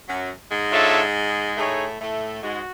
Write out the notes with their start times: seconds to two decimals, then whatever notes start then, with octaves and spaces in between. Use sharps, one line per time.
0.08 F#2 F#3
0.51 G#2 G#3
0.72 D4 F4 A4 C#5 E5
1.57 A2 A3 D#4 G#4 C#5
2.00 A2 A3
2.42 G#2 G#3 F#4